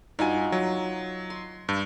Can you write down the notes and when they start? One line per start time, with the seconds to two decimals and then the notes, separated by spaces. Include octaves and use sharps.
0.19 G2 D#4 F4 F#4 G#5
0.52 F#3
1.30 C6
1.69 G2